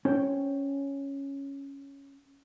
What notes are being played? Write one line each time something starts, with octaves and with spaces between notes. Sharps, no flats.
C#4 C5 C#5 G5